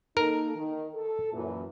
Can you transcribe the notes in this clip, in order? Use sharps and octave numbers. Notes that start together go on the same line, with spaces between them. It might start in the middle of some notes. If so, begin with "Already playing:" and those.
A#3 D#4 A4 A#4
D#3
A4
F#2 A#2 E3